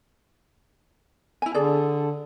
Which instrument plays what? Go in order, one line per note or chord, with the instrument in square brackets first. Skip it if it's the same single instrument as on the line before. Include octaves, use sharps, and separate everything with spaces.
[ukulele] E4 G#5
[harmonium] D3 [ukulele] G#4 A4 D5